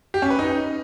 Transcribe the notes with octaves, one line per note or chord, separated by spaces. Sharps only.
G4
C#4
B4
D#4